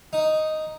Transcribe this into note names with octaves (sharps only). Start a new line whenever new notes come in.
D#4